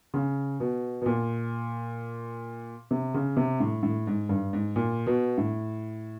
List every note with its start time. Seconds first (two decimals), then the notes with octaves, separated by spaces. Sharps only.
0.14 C#3
0.60 B2
1.01 B2
1.06 A#2
2.91 C3
3.14 C#3
3.37 C3
3.60 A2
3.83 A2
4.07 G#2
4.29 G2
4.53 G#2
4.76 A#2
5.07 B2
5.38 A2